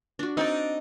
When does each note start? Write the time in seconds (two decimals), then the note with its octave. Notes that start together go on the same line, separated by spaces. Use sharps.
0.19 D4 F#4
0.37 C4 D4 D#4 D5